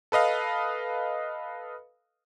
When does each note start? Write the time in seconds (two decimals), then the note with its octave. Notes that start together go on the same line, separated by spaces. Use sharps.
0.12 A4 B4 D#5 F5